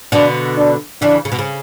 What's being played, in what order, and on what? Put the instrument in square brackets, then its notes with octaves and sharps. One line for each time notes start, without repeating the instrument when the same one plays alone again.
[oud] B2 D3 [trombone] D4
[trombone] D4
[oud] C#3 E3 [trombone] D4
[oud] C#3
B2
C#3